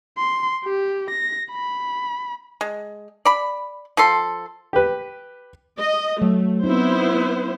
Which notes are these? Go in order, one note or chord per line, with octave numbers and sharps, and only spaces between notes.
C6
G4
A#6
B5
G#3
D5 B5
F3 A4 C6
G4 B4
D#5
F#3 A3
B3 C4 D#4 E4 C5